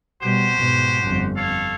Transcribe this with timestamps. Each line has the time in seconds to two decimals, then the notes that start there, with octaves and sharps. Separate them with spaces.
0.22 B2 G3 F#4 G4 C5
0.56 G#2 B2
1.04 G1 F2
1.36 A4 C#5 F5